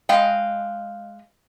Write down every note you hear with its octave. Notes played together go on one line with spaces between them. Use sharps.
G#3 D#5 F5 G5